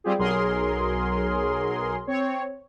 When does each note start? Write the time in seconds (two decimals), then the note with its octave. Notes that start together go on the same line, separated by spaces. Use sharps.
0.04 G3 C4 F4 G4 G#4
0.19 B1 F#3 G#4 A#4 C6
2.07 C4 C#5